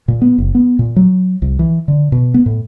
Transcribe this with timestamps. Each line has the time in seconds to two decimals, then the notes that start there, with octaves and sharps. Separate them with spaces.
0.08 A#2
0.22 B3
0.38 F#1
0.55 B3
0.79 A#2
0.96 F#3
1.42 C2
1.59 E3
1.88 D3
2.12 B2
2.34 B3
2.46 A2